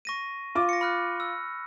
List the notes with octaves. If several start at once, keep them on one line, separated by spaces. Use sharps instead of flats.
C#6 A#6 D#7
F4 D6
A#6 C#7
B5 F6 F#6
E6